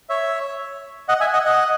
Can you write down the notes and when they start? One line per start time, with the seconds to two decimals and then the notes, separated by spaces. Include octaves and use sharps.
0.09 C#5 E5
1.08 D#5 F#5
1.21 E5 G#5
1.33 D#5 F#5
1.45 D#5 F#5